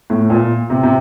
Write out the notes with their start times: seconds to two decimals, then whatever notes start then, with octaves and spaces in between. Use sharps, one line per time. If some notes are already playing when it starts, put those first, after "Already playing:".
0.10 A2
0.30 A#2
0.70 C3
0.83 C3